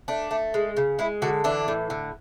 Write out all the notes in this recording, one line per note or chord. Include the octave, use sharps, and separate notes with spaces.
A3 D4
A3
G#3
C#3
G#3 E4
D3 F#4
E3 D4
A2
D3